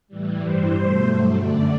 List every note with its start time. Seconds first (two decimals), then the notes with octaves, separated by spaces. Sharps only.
0.08 A2 E3 G3
0.40 G2 E3 G3 C5
0.72 B2 A3
1.04 G2 F#3 A3
1.37 F#2 D3 A3 D5